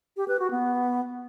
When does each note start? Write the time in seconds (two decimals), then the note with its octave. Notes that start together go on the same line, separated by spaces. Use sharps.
0.17 G4
0.28 B4
0.39 F#4
0.51 B3